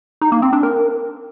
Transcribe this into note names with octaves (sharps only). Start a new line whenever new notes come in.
D#4
A#3
C4
D4
A#4